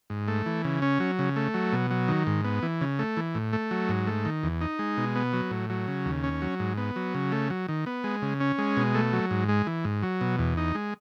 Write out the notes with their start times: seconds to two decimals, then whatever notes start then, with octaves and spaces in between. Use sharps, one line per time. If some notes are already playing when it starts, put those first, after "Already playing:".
0.10 G#2
0.28 A3
0.46 E3
0.65 C#3
0.82 C#4
1.00 F#3
1.19 C#3
1.36 A3
1.54 F#3
1.73 B2
1.91 F#3
2.08 D#3
2.27 G#2
2.44 B3
2.62 E3
2.81 C#3
2.99 A3
3.17 E3
3.35 A2
3.53 A3
3.71 F#3
3.89 G#2
4.07 A3
4.25 D#3
4.43 E2
4.61 D#4
4.79 G#3
4.97 B2
5.16 B3
5.33 F#3
5.51 A2
5.70 F#3
5.88 C#3
6.06 D#2
6.24 C#4
6.42 F#3
6.60 G#2
6.78 B3
6.96 F#3
7.14 C#3
7.32 A3
7.50 F#3
7.68 D#3
7.86 B3
8.04 G#3
8.22 C#3
8.40 C#4
8.58 G#3
8.77 B2
8.94 A3
9.13 F#3
9.31 G#2
9.49 G#3
9.67 E3
9.85 G#2
10.03 F#3
10.21 B2
10.39 E2
10.57 D#4
10.75 G#3